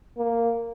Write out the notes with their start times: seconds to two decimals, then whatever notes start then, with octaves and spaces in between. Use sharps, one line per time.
0.18 A#3